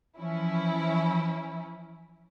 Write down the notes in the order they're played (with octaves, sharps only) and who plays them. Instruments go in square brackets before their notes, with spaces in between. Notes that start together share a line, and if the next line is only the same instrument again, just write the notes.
[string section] E3 F3 C#4 E4